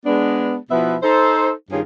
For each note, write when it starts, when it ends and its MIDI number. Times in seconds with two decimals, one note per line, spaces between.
0.06 0.56 56
0.06 0.56 59
0.06 0.56 62
0.71 0.96 47
0.71 0.96 53
0.71 0.96 59
0.71 0.96 64
0.71 0.96 71
0.71 0.96 76
1.03 1.51 63
1.03 1.51 69
1.03 1.51 72
1.71 1.81 43
1.71 1.81 51
1.71 1.81 61
1.71 1.81 65
1.71 1.81 68